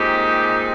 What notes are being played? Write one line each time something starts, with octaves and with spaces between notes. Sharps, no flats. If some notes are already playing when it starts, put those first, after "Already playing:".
Already playing: A#2 G#3 C4 D#4 G4